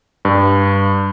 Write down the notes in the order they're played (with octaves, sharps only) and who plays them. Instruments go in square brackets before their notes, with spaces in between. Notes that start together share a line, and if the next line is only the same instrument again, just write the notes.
[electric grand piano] G2